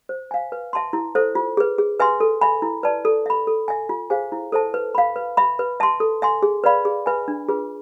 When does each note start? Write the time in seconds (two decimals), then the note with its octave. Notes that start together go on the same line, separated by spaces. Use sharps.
0.09 C5
0.31 F5 G#5
0.52 B4
0.73 E5 A5 C6
0.93 E4
1.15 A4 C5 E5
1.35 F4
1.57 G#4 B4
1.78 G#4
1.99 B4 E5 G#5 C6
2.20 A4
2.41 E5 G#5 B5
2.62 E4
2.83 B4 D5 A5
3.05 A4
3.26 E5 B5
3.47 A4
3.68 E5 G#5
3.89 F4
4.10 G#4 C5 F5 G#5
4.32 E4
4.52 A4 C5 E5 A5
4.74 B4
4.95 F5 B5
5.16 B4
5.37 E5 B5
5.59 B4
5.80 E5 A5 C6
6.00 A4
6.22 E5 G#5 C6
6.43 G#4
6.64 B4 D5 F5 B5
6.85 G#4
7.06 B4 E5 G#5 B5
7.28 D4
7.48 F4 G#4 B4